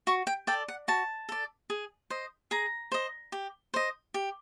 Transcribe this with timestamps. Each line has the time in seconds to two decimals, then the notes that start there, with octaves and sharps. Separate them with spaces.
0.07 F#4 C#6
0.27 G5
0.47 A4 D5 G5
0.68 F#5
0.88 F#4 A5
1.29 A4 D5
1.70 G#4
2.10 C5 D#5
2.51 G#4 A#5
2.92 C5 D#5
3.32 G4
3.74 C5 D#5
4.14 G4